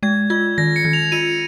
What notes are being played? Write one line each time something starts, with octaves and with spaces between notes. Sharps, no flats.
G#3 G#6
F4 G#6
D#3 A#6
C#7
D#3
F7
F4 D#7